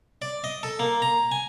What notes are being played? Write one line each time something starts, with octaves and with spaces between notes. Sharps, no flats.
D5
D#5
A4
A#3
A#5
G#5